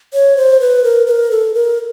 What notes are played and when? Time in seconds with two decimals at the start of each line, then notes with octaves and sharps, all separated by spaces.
0.13 C#5
0.37 C5
0.60 B4
0.84 A#4
1.07 B4
1.11 A#4
1.31 A4
1.54 A#4